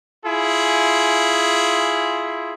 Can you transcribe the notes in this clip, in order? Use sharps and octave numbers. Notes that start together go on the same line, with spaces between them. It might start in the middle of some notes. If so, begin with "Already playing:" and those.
E4 F4 G#4